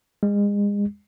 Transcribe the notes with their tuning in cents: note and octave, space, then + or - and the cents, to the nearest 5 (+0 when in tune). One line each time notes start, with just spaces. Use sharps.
G#3 -35